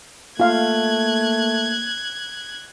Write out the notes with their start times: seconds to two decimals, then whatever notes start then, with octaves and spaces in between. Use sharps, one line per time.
0.40 A3 A#3 F4 F5 F#6 G#6